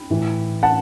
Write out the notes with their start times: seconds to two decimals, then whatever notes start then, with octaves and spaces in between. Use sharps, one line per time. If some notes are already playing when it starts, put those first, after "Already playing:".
Already playing: G5 B5
0.10 A2 E3
0.63 F#5 A5